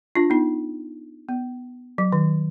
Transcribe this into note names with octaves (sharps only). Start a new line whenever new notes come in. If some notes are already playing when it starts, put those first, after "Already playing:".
D4 F4
B3 D#4
B3
F#3
D#3